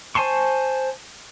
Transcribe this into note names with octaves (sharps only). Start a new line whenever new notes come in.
C5 G#5 A5 C6 C#6